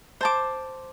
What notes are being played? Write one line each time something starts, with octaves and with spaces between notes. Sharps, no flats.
C5 A5 D6